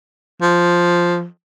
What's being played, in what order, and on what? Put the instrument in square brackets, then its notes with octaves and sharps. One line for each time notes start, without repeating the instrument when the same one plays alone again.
[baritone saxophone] F3